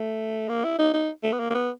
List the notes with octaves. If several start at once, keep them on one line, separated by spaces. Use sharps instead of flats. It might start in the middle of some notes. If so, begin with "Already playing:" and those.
Already playing: A3
A#3
E4
D#4
D#4
A3
B3
A#3
A#3
B3